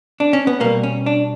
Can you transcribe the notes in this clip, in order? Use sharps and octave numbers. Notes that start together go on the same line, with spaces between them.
D4
C#4
B3
B2 G3 A#3
C#4
D4